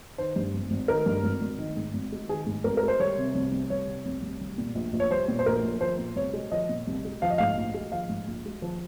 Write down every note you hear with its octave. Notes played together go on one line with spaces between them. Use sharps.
D#3 C5
G2
G#1
G#1
D#3 A#4
G2
G#1
G#1
D#3
G#2
G#1
G#3
D#3 G#4
G#2
G#1 A#4
A#4
G#3
C5
G3 C#5
C3
C2
C2
G3 C#5
C3
C2
C2
G3
A#2
A#1
A#1
C#5
G3 C5
A#2
C5
A#1 A#4
A#1
F3 C5
A#2
C2 C#5
G#3
F3 D#5
A#2
C2
G#3
F3 F5
D#5
G#2 F5
A#1
G#3
F3 F5
G#2
A#1
G#3
F3